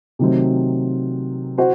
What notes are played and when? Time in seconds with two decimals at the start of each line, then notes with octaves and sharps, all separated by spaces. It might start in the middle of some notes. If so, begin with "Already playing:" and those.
0.19 C3 D#3 F#3 A3 C4
1.58 F#4 C5